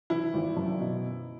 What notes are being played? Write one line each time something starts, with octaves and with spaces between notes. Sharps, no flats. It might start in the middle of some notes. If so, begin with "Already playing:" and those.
E3 E4
G#1
F#2
B2